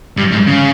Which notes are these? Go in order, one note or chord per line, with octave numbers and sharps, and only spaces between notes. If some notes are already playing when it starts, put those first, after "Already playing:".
G2
G#2
C#3